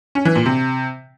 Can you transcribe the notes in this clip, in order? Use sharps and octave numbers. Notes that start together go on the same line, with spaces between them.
C#4
E3
A#2
C3